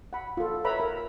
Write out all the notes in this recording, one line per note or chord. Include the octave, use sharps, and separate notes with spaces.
F#5 B5
F4 A4
B4 C#5 E5 A#5 B5
A#4